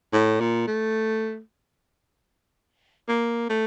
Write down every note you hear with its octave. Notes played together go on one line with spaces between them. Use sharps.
A2
A#2
A3
A#3
A3